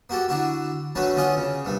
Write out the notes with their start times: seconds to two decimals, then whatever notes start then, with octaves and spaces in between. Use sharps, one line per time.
0.10 A#3 F#4 G4 A4
0.29 D3 D4 E4 F#4
0.95 D3 F#3 A3 C#4 F#4 B4
1.16 D3 C#4 F4 D#5 F#5 G#5
1.37 C#3
1.65 C2 G2 A3